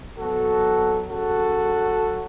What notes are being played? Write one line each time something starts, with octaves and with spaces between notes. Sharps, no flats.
B2 F#3 F#4 A4
C#3 F#3 F#4 A4
F#3